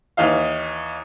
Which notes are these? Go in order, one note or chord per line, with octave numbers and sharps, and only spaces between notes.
D#2 E3 D#4 F5